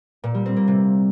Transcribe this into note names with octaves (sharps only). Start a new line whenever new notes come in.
A#2
G3
C4
A#3
C3